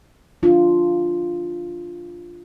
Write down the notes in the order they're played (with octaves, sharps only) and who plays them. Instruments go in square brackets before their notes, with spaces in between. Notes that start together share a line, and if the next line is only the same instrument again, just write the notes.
[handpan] D4 F4